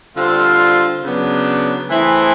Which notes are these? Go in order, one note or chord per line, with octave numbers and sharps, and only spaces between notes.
D3 G3 C4 F4
C#3 F#3 B3 D4
E3 A3 C4 E4 G#4